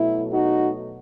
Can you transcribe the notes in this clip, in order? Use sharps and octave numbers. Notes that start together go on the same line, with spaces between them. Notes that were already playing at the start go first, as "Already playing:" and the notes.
Already playing: B2 F#3 A3 E4
D#4 F#4